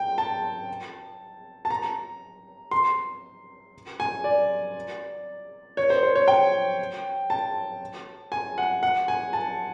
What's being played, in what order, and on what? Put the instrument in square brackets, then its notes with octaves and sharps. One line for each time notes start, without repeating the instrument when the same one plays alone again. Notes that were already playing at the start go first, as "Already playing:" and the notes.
Already playing: [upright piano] G5
A5
A5
A#5
C6
G#5
D5
C#5
C5
C5
C#5
G5
A5
G#5
F#5
F#5
G#5
A5